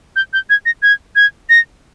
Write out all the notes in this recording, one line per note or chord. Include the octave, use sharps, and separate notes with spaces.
G6
G6
G#6
A#6
G#6
G#6
A#6